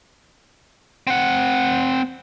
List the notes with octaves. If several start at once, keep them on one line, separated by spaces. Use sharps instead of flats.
C4 F#5